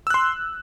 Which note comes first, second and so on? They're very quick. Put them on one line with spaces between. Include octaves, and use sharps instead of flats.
E6 F#6 C6